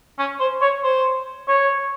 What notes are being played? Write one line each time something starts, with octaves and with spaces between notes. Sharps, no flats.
C#4
C5
C#5
C5
C#5